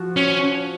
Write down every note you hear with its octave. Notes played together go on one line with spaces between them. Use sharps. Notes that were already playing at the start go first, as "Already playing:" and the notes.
Already playing: F3 F#4
C#4